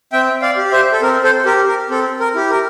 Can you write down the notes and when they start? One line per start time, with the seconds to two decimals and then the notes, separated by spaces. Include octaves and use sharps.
0.12 C4 E5 G5
0.42 D5 F5
0.57 G4
0.72 C5 E5
0.92 A4
1.02 C4 A#4
1.24 A4 C5
1.45 G4 A#4
1.68 A#4
1.90 C4 A4
2.20 A#4
2.35 E4 G4
2.50 A#4